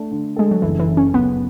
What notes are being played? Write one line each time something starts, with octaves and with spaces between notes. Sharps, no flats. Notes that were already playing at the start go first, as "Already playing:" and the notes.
Already playing: A3 D4
D3
G#3 A4
F#3
F#1 E3
E3
C#3
C#4
F#1 B3